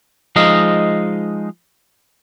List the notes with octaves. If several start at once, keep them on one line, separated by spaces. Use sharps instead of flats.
F3 G#3 D#4 D#5 F5